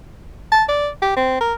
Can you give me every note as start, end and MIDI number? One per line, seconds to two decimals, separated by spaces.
0.52 0.64 81
0.69 0.89 74
1.02 1.16 67
1.17 1.38 60
1.41 1.54 70